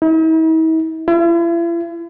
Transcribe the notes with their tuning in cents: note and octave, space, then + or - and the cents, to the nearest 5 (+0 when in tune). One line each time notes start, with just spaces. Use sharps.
E4 -45
E4 +45